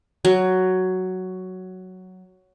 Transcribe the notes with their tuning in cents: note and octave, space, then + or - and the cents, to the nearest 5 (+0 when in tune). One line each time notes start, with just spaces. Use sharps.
F#3 +5